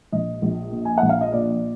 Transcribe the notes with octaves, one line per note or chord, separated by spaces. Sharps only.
A#1 D#5
A#1
A#2
G#5
A#1 F#5
F5
D#5
A#2 D5